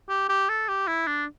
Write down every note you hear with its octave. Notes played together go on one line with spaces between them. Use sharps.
G4
G4
A4
G4
E4
D4